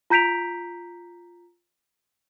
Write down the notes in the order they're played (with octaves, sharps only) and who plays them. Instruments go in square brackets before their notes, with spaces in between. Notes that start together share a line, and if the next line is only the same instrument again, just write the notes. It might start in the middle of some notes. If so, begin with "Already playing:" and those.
[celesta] F4 A#5 G6 B6 D7 F7